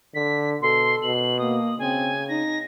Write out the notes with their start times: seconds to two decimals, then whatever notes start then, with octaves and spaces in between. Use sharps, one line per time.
0.15 D3 B6
0.62 B2 A4 C6
1.02 B2 F#7
1.39 A#3 D#6
1.79 C#3 C4 G#5
2.29 D#4 A#6